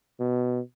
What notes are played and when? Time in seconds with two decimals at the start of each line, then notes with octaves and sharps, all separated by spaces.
0.20 B2